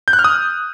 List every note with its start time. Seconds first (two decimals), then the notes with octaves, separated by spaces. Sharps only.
0.08 G6
0.13 F#6
0.19 F6
0.24 D#6